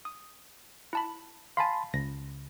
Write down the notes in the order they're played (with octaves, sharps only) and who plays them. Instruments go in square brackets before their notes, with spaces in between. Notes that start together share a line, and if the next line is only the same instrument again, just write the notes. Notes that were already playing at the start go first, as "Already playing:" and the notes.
[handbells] D#6
E4 A5 B5
[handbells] F5 G#5 [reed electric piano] A5 B5 C6
[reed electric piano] C#2 [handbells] A#6